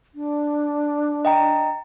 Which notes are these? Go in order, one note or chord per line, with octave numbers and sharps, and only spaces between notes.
D4
D#5 G5 A#5